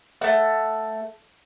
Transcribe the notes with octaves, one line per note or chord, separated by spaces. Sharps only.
A3 F#5